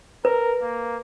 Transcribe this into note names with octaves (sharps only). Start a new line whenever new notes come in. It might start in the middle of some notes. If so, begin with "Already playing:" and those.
A#4 B4
A#3